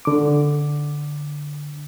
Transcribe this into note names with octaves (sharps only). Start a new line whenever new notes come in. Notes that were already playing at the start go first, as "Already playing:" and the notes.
D3 D6